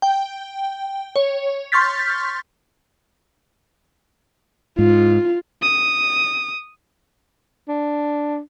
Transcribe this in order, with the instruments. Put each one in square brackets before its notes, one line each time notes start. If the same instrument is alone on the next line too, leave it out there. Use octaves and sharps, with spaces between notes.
[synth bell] G5
C#5
C6 C#6 F6 G6 A6 B6
[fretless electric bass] G#2 [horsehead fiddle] F4
[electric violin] D#6
[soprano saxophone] D4